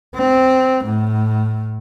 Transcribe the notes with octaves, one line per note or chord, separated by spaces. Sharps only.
C4
A2